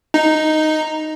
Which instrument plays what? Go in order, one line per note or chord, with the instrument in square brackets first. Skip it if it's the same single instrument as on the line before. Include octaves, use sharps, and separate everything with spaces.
[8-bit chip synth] D#4